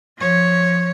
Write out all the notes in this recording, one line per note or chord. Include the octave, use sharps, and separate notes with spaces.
F3 C#5